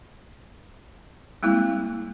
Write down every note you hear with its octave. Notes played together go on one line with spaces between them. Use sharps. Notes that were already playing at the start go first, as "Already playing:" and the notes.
G3 G#3 A#3 C4 E4